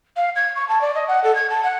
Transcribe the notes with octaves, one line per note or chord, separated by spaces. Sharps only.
F5
G#6
C#6
A5
D5
D#5
F#5
A4
G#6
A5
F#5